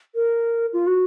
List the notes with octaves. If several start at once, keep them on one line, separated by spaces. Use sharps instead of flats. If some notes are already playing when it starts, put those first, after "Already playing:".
A#4
F4
F#4